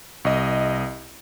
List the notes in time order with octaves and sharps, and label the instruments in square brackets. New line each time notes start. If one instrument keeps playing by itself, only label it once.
[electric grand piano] C2 D#5